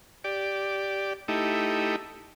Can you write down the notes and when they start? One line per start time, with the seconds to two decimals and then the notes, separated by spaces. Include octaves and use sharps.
0.24 G4 D5
1.28 A3 D#4 E4 G4